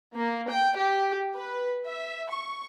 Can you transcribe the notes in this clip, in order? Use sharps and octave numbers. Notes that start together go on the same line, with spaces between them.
A#3
G5
G4
B4
E5
C#6